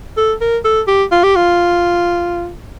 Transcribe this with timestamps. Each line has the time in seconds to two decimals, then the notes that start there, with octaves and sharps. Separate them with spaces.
0.17 A4
0.41 A#4
0.64 A4
0.87 G4
1.11 F4
1.23 G4
1.36 F4